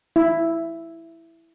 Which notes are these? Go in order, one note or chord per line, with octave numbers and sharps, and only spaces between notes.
E4